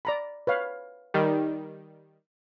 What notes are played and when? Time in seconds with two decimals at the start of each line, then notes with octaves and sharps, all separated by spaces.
0.05 D5 A#5 B5
0.47 B4 C#5 F5
1.14 D#3 G3